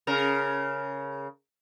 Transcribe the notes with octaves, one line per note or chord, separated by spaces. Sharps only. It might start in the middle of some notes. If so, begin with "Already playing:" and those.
C#3 A#4